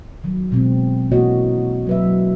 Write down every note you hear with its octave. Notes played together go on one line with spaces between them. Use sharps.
D#3 F#3
B2 G#3 C4
B2 E3 A#3 F#4 C#5 D#5
F#3 B4 E5
F#3